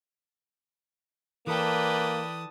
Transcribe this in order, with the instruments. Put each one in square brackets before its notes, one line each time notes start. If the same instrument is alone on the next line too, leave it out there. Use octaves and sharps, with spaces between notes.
[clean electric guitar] E3 A4 [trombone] A#3 [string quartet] B4 D5 G5 [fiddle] A5 D#6